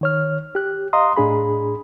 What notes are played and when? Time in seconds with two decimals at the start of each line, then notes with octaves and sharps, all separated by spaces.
0.01 D#3 C#5 F6
0.55 G4 F#6
0.93 D#5 F5 A#5 C6 D#6
1.17 A2 D4 G#4 B5